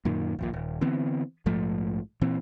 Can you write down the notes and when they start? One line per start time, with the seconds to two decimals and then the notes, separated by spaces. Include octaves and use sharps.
0.05 F#2 A#2 D#3
0.39 D#1 A#1 A#2
0.53 D#1
0.81 D3 E3 B3 C4
1.46 A#1 G#2 F3 A3
2.21 A#2 E3 C4